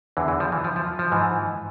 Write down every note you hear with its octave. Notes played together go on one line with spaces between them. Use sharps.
E2 D3 E3
E3
F3
E3
F3
F3
F3
G#2 E3